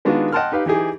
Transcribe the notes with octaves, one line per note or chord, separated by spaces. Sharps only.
D#3 G#3 B3 D4 F4 F#4
D#5 F#5 G5 A5 C6 F6
D#4 G4 B4 F5
E3 D#4 G4 G#4